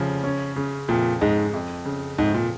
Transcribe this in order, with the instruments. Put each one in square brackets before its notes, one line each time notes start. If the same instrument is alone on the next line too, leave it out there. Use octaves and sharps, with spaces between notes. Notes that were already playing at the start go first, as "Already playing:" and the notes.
Already playing: [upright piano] F1 F3 [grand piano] C#3
[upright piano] C#4
C#3
[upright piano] F2 [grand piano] A#2
[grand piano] G#2 [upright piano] G#3
[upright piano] F2
C#3
[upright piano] F2 [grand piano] G#2
[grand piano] A#2